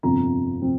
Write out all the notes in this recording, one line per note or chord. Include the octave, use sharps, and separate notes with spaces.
G1 F2 C3 F3 C4 A#5
C3 F3 C4